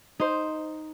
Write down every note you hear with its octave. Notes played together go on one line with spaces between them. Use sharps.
D#4 C5